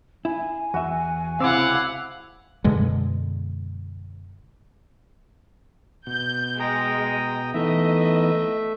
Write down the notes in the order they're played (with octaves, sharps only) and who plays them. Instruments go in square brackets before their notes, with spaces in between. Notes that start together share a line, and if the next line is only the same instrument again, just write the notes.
[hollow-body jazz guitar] E4 [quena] G#5
[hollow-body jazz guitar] E2 E5 [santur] F#4
[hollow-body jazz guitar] C#2 C3 C4 [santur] E4 D6 E6 [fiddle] F5 F#5
[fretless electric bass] F#2 B2 D3 G#3
[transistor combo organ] B2 [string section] G6
[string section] G#3 [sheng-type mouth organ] G5 A#5 D#6
[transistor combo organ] E3 B3 D#4 [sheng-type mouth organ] A3 E5 [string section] D#5